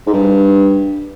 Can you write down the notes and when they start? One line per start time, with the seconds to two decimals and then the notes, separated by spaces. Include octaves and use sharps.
0.07 G#2
0.13 G2